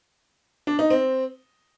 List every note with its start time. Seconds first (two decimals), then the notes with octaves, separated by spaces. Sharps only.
0.67 D4
0.79 D#4
0.90 C4